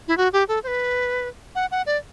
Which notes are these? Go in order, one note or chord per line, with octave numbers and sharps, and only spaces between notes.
E4
F#4
G4
A4
C5
B4
F#5
F#5
D5